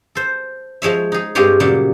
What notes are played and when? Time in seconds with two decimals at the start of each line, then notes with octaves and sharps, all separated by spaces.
0.15 A4 C5
0.82 F3 G#3 C#5 E5
1.12 D#4 G#4
1.35 G2 G#3 C4 F4 G4 C#5
1.60 A#2 C#3 F#3 G3